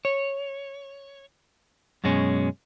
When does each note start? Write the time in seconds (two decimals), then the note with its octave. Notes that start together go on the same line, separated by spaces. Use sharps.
0.05 C#5
2.04 F#2 B2 G#3 C#4